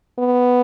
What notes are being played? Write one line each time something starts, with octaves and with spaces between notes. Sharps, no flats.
B3